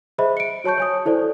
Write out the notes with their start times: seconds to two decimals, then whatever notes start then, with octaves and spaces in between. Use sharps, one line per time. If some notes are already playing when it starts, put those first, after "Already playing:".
0.18 G#4 C5 D#5 E5 B5
0.37 C#7 D7
0.64 F#4 C#5 A5 C#6 G6
0.78 C#5 G#5 D#6
1.06 E4 A4 C5 D5